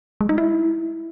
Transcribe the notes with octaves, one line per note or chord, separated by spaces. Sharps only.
G#3
D#4
E4